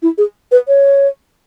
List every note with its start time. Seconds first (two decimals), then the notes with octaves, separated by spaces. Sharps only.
0.02 E4
0.18 G#4
0.52 B4
0.68 C#5